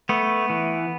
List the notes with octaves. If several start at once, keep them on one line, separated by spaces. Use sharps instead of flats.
A3 B3
E3